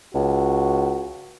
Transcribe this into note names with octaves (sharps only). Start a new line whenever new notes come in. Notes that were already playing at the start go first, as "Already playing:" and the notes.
C#2 F#4